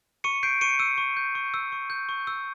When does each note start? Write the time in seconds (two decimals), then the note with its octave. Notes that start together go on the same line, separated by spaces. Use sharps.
0.24 C#6 C#7 D#7
0.43 G6 C7 D7
0.61 C#6 C#7 D#7
0.79 E6 C#7 D#7
0.98 C#6
1.17 G6
1.35 C#6
1.54 E6
1.72 C#6
1.90 G6
2.09 C#6
2.27 E6